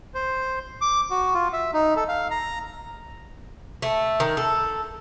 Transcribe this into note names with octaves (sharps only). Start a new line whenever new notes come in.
C5
D6
F#4
F4
E5
D#4
A4
F5
A#5
A3
D#3
A4